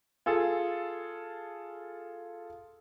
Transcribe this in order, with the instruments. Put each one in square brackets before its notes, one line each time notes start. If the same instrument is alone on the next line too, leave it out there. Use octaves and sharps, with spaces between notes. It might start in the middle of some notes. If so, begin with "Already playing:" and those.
[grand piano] F4 G#4 A4